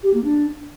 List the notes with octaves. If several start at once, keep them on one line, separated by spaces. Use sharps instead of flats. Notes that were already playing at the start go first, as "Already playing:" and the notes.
G4
A#3
D4